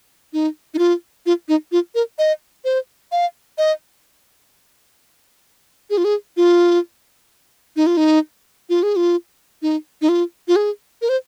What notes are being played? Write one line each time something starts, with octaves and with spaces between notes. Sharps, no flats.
D#4
D#4
F4
F4
D#4
F4
A#4
D#5
C5
F5
D#5
G#4
F4
G#4
F4
D#4
F4
D#4
F4
G#4
F4
D#4
D#4
F4
F4
G#4
A#4
C5